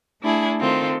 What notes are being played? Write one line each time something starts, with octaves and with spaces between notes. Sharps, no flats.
A3 D4 E4 G#4
D#3 C4 F4 A4